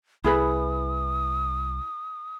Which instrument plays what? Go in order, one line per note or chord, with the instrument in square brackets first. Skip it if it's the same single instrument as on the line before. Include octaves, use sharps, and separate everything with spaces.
[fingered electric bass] C2 [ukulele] E4 G#4 B4 [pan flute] D#6